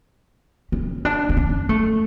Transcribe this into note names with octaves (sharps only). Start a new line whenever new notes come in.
C#4
D4
D4
C#4
A3